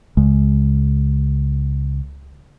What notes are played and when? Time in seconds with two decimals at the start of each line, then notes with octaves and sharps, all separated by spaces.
0.17 C#2 C#3 G#3